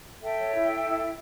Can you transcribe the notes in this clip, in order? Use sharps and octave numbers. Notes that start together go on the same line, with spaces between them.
A4 E5 G5
C#5
E4
A4
E4
E4